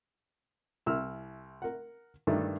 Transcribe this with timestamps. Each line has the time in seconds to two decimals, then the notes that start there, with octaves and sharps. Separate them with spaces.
0.86 C2 E4 E6 F6
1.62 A#4 F#5
2.27 G2 D#3 A3 D4 E4